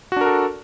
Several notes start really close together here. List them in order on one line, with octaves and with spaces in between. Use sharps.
F#4 D4 A#4 A4